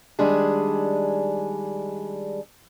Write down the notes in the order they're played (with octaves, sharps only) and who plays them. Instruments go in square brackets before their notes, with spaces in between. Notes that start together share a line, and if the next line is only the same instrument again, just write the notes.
[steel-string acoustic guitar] D#3 G3 G#3 D4 G#4